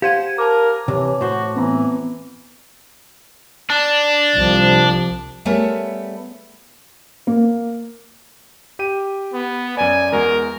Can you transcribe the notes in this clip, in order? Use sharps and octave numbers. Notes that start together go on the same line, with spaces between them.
G4 C5 F5 F#5 G#6 D#7
A#4 A5 D6
C3 E3 C#5
A2 F#4 C5
E3 B3 C4 A#5
D4
C2 F3
G3 A3 B3 G#4 A#4 C#5
A#3
G4 G5 D#7
B3
F#2 D5 G#5
E2 G#3 F#4 A#4